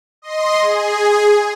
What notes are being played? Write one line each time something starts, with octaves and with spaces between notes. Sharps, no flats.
D#5 C6
G#4